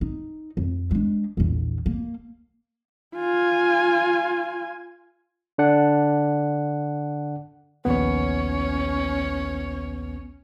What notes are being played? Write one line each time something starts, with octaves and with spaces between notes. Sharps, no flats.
D#4
F2
G#3 D4
A#1 E2
A#3
F4 G#5
D3 D4 F#5
A#1 D#2 B3 C#4 C#5